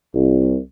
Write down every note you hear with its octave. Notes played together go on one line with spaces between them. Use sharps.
C2